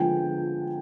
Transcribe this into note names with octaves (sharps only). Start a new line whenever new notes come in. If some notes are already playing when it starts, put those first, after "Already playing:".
Already playing: D3 F3 G#3 B3 G5 G#5